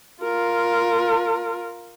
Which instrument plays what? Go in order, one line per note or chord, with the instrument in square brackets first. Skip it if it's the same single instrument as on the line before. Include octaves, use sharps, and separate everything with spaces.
[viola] F4 A#4